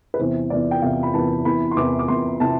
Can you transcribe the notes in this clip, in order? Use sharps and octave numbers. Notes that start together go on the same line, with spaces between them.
B4
E2 C3 E3 C5
E2 C3 E3 D5
G5
E2 C3 E3 F5
B5
E2 C3 E3 A5
E2 C3 E3 B5
C6
E2 C3 E3 D6
D6
E2 C3 E3 C6
C3 E3 A5